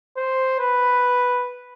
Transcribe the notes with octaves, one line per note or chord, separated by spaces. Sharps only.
C5
B4